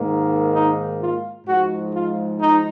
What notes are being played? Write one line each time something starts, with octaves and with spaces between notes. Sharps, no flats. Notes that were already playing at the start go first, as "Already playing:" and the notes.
Already playing: G#2 D#3 A#3
D#4
F4
G#2 F3 G#3 F#4
F4
D#4